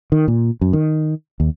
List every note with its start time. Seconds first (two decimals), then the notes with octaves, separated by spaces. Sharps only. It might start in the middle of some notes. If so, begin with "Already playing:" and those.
0.12 D#3
0.28 A#2
0.61 F#2
0.73 D#3
1.40 D#2